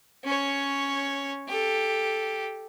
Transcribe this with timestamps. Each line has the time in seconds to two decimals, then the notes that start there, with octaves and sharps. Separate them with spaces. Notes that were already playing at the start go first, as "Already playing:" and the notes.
0.24 C#4 C#5
1.48 G4 A4